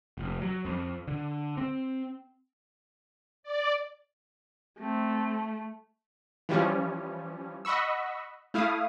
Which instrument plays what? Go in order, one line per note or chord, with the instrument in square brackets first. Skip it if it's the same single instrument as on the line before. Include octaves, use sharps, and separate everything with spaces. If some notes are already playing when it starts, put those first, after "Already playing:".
[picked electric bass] F1
F#3
F2
D3
C4
[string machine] D5
[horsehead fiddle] A3 [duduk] C4
[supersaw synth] E3 F3 G3 C#4
D#5 F#5 B5 C#6 E6
A3 E4 F5 D#6